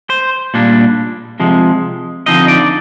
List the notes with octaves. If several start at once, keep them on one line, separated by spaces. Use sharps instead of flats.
C5
A#2 G3 D4
C3 F3 G#3
D3 F3 C4 D#4 D#5
D5